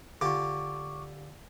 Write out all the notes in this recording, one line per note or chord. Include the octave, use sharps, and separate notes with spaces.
D3 F4 G4 C#6 D6